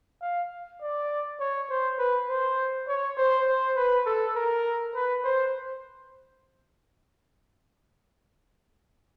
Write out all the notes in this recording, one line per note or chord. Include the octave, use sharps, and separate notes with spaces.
F5
D5
C#5
C5
B4
C5
C#5
C5
C5
B4
A4
A#4
B4
C5